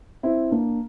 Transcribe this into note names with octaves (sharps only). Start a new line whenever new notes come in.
C4 E4
A#3 D4